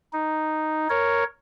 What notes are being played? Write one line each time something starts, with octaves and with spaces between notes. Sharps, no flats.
D#4
A#4 C#5